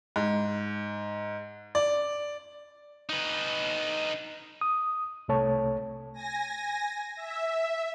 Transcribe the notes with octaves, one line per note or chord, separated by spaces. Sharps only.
G#2
D5
D#4 B4
D#6
C2 C3 A3 C#5 A5
G#5 A#6
E5